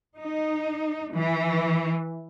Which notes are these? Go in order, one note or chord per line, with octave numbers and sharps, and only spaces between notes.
D#4
E3